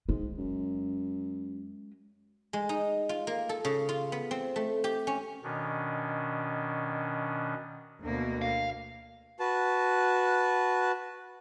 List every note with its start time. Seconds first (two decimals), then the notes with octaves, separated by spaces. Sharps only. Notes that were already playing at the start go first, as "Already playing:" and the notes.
0.09 G#2 G#3
0.38 F#2
2.53 G#3
2.69 D#4
3.09 F4
3.27 A#3
3.49 A4
3.65 C#3
3.89 F4
4.12 B3
4.31 C4
4.56 A3
4.84 G4
5.07 C#4
5.43 B2 D#3 C#4 D4
8.01 D2 B2 A#3
8.42 F5
9.40 F#4 B4 A5